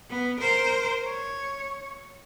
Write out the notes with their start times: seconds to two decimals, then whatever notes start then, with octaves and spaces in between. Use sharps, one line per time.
0.10 B3
0.40 A#4 C5
1.05 C#5